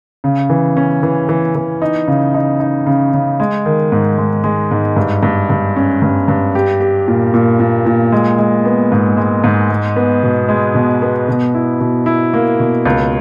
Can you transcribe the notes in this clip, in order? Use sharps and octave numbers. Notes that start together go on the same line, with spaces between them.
C#3
E3
C#4
E3
E3
E3
D#4
C#3
D#4
D#4
C#3
C#3
G#3
D#3
G#2
G#3
G#3
G#2
G2
G2
G2
C#4
G2
G2
G4
G4
A#2
A#2
A#2
A#2
G#3
G#3
B3
G#2
G#3
G#2
G#3
B3
B2
G#3
B2
B3
B2
E4
B2
E4
A#3
B2
C#2